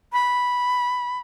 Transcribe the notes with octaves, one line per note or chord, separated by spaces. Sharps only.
B5